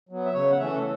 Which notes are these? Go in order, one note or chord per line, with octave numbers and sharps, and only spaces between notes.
F#3 B3
E5
C#3 C#5
F#5
E3 A3 C#4 E5
A4